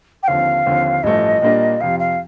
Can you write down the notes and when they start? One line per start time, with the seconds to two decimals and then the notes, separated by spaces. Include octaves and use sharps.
0.23 G5
0.28 D#2 D3 F3 C4 F5
0.66 D#2 D3 F3 C4
1.03 A1 G2 F3 A3 D#5
1.42 A#2 G3 A#3 D4
1.80 F2 C3 F3 F5
1.99 F5